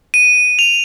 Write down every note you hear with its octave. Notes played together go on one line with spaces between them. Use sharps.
D#7
F7